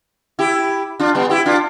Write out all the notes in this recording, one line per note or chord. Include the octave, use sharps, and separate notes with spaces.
E4 G4
D4 F4
G3 B3
E4 G4
D4 F4